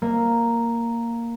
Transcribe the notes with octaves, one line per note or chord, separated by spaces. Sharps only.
A#3